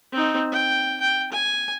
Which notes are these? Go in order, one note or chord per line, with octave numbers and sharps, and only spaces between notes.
C4 D#4
G5
G5
G#5